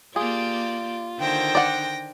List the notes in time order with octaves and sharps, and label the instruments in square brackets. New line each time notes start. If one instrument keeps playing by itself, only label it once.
[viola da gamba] A#3 G4 D5 [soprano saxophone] F4 [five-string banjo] G#4
[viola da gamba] D3 D#3 C5 [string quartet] G5 A#6
[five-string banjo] D5 F#5